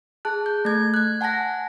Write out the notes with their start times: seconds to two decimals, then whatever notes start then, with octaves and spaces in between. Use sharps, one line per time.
0.25 G#4 A5 F#6
0.46 G6
0.65 A3 G#6
0.94 F#6 G#6
1.21 F#5 G#5 A5 F#6 A#6